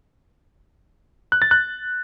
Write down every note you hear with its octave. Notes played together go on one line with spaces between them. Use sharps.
F#6
A6
F#6